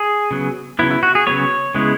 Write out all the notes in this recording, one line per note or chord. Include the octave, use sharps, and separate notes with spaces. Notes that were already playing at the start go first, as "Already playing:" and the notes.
Already playing: G#4
C#3 F#3 B3
C#3 F#3 B3 E4
E4
F#4
G#4
C#3 F#3 B3 C#5
C#3 G#3 B3 E4